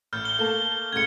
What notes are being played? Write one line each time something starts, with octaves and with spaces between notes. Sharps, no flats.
A1 F6 G6
G7
A3 A#3 A5
C#2 A2 G#6 C#7